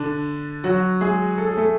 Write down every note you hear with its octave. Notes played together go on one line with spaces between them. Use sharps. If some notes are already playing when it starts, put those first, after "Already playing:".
Already playing: D3 D4
F#3 F#4
G#3 G#4
A4
G#4
A3 A4